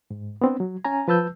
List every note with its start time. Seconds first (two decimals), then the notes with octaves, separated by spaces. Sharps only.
0.11 G#2
0.41 B3 C4 D4
0.60 F#3
0.85 C#4 G#5 A#5
1.08 F3 B4 A5 E6 G6